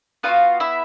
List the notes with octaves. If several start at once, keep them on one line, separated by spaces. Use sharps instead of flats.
B3 D#4 F4 F#4 F5
E4 E5